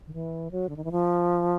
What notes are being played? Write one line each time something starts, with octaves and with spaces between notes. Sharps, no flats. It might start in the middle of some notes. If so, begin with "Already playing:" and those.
D#3
E3
F#3
D3
D#3
E3
F3